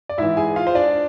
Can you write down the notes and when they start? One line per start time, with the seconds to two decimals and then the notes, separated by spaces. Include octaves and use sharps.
0.09 D5
0.18 G#2 E3 E4 E5
0.37 G#4 G#5
0.56 F4 F5
0.67 C5
0.75 D4 D5